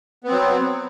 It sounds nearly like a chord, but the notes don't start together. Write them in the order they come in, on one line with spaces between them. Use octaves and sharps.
B3 C4 F#3